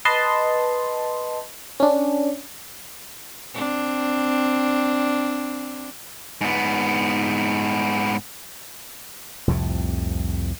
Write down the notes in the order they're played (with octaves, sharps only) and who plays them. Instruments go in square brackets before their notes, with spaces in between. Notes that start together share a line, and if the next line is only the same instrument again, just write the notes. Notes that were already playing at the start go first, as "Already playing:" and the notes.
[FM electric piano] B4 D#5 A5 C6
C#4 D4
[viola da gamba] C4 D4
[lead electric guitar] G#2 B3
[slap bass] C2 F2 A2 C3